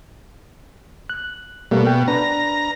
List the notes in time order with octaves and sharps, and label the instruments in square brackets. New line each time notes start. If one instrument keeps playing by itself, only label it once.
[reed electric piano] F#6
[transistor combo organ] B2 [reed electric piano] G3 A3 A#3
[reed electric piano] G5
[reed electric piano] D4 B4 [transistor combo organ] A#5